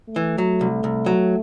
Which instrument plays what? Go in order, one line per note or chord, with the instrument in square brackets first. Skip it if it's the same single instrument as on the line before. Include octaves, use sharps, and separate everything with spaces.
[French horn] A3
[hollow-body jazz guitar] E3
F#3
C2
C2
F#3